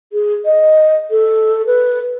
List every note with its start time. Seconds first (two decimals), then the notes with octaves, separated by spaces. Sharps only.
0.13 G#4
0.45 D#5
1.11 A4
1.67 B4